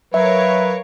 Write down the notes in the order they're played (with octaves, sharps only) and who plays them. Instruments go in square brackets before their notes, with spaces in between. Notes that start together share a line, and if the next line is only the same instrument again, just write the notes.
[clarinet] F#3 [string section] A#4 C#5 F5 [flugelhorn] B4 [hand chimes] E5